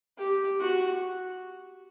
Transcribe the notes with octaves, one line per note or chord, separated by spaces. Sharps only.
G4
F#4